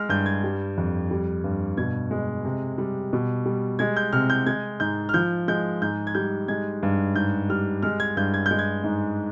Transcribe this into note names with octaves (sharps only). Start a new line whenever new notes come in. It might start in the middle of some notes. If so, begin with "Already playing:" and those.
Already playing: G#3 F6
G2 G6
G#6
G3
F2
G3
G2
B2 G#6
G#3
C3
G3
B2
G3
G#3 G#6
G6
C3 F6
G6
G#3 G#6
G#2 G6
F6
F3 G6
G#3 G6
G#2 G6
G#6
G3 G6
G#3 G#6
G2
G#2 G6
G3 F6
G#3 F6
G#6
G2 G6
G#6
G6
G#3
G#6
G#2